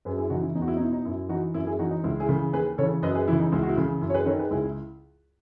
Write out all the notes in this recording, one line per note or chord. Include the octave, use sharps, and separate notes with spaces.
F#2 G#4 B4
E4 G#4
C#3 E3 D#4 F#4
E4
E2 D#4
F#4
E4
D#4
B2 E4
D#4
F#2 E4
E3 D#4 F#4
F#2 E4
E4 G#4
E3 D#4 F#4
D#4
C#2 E4
E4 G#4
C#3 E3
D#2 G#4 B4
C#3 E3 A4 C#5
F#2 B4 D#5
G#4 B4
C#3 E3 E4
D#4
C#2 E4
F#4
E4
C#3 E3
F#2 E4
C#5
G#4 B4
D#3 A4 C#5
G#4 B4
C#2 E4 G#4
E4